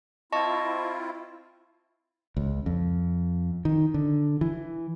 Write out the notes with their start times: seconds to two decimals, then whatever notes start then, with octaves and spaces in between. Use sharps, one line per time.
0.32 C4 E4 F4 D#5 A5 C#6
2.37 C#2
2.66 F2
3.65 D#3
3.94 D3
4.41 E3